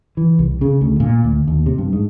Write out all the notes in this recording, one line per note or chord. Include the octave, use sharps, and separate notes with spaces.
E3
C2
C#3
D2
A#2
D2
D#2
C3
G2
G#2